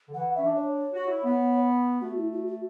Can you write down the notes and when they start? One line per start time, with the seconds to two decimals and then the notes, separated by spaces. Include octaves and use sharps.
0.08 D3
0.14 E3 F#5
0.35 C#4 E5
0.45 D4
0.56 C#5
0.93 F#4
1.07 E4
1.24 B3
2.01 A3 F#4
2.17 E4
2.32 F#4
2.47 F#4